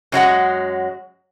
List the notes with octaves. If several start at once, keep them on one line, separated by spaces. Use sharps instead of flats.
F#2 F#3 G#3 F#5